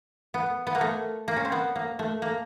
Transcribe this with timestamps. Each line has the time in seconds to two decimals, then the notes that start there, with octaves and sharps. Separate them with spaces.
0.34 B3
0.67 B3
0.75 A#3
0.81 A3
1.28 A#3
1.36 C#4
1.45 C4
1.52 B3
1.76 A#3
1.99 A3
2.22 A#3